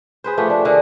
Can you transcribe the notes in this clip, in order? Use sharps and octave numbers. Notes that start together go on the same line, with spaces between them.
G#4 B4 C5
F3 A3 G4 B4
D4
D3 G#4 A#4 F#5